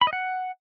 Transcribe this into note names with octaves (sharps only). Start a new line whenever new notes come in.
B5
D#5
F#5